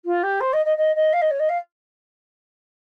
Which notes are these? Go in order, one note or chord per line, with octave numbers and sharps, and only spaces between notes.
F4
G4
C5
D#5
D#5
D#5
D#5
F5
D#5
C#5
D#5
F5